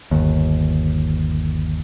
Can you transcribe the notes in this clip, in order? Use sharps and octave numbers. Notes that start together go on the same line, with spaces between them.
G1 D#2